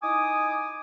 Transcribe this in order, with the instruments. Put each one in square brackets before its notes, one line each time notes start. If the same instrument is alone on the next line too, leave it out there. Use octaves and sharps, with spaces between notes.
[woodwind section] D#4 E4 G#5 D6 D#6